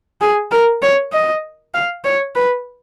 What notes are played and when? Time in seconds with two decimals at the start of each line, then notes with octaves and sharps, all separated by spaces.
0.21 G#4
0.51 A#4
0.82 C#5
1.13 D#5
1.74 F5
2.04 C#5
2.35 B4